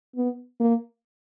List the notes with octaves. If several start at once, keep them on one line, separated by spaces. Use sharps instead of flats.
B3
A#3